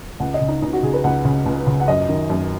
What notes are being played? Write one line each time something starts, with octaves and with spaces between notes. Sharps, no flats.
C#2 F#5
D#5
C#3
D#4
C#2 D#4
F#4
C#3 G#4
B4
C#2 F#5
C#3
C#2
C#3
F#5
F#2 D#5
D#3
F#2